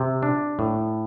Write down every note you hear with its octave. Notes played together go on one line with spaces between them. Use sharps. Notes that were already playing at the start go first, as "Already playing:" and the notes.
Already playing: C3
D4
A2